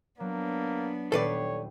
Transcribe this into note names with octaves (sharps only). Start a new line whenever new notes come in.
F#3 A#3 B3 D4
D#1 A4 B4 C#5 D5 G5 C7